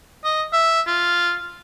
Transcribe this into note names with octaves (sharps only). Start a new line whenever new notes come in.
D#5
E5
F4